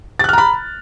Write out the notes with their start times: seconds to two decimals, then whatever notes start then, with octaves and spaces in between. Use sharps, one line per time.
0.19 A6
0.24 F#6
0.29 F6
0.33 A#5
0.38 B5